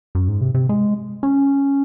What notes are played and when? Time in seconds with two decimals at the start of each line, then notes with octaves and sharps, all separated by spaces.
0.15 F#2
0.28 G#2
0.41 C3
0.55 C3
0.69 G#3
1.23 C#4